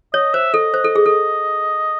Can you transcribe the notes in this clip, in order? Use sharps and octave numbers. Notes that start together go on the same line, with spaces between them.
C#5 D#5
C5 E5
A4 D#5
C5
A4
G#4
A4